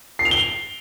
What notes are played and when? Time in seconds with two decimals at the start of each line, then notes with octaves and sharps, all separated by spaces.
0.19 C7
0.25 F7
0.31 G7